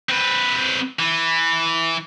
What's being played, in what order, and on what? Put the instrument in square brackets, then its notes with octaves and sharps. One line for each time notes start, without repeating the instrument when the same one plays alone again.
[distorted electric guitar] C4 B4
E3